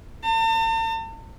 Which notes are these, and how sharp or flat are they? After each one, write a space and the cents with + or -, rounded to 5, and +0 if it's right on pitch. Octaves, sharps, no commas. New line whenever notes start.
A5 +45